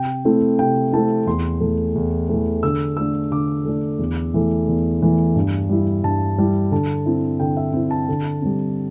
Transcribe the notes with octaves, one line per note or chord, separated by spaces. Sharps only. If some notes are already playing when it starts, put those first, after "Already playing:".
Already playing: C3 G5
A3 C4 E4
C3 G5
A3 C4 E4 A5
E2 C6
E3 A3
E2
E3 A3
D3 E6
A3 D4 E6
D3 D6
A3 D4
E2
E3 A3
E2
E3 A3
G2
G3 E4
G2 A5
G3 E4
D3 A5
C4 E4
D3 G5
E5
C4 E4
A5
D3
G3 C4